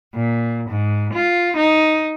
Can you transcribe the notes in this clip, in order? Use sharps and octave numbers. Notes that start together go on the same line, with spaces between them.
A#2
G#2
F4
D#4